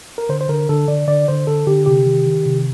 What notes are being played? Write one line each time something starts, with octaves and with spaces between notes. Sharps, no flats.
A#4
D3 C5
C5
D3 A#4
D3 A4
D3 D5
D3 D5
D3 C5
D3 A4
D3 G4
C3 G4
D#3
D#3
C3